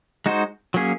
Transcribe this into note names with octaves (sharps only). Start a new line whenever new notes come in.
G#3 D#4 F#4 C5
F#3 A#3 C#4 G#4